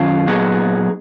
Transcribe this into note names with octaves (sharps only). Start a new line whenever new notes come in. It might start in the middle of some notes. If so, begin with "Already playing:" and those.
Already playing: F#2 D#3 C#4 F4
A#2 F#3 B3 D#4 G#4